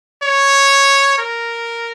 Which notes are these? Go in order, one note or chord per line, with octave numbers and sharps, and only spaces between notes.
C#5
A#4